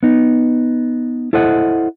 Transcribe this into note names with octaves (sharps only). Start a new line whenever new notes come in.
B3 D#4
E4 A4 C5 D#5 F#5